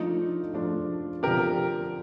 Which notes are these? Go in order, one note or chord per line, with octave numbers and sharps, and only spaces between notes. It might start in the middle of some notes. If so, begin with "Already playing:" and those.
Already playing: F3 A3 D4 D#4 F4
F3 A3 D4 F4
D3 F3 C4 G4 A#4